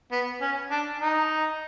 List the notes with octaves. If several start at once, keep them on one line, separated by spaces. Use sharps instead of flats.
B3
C#4
D4
D#4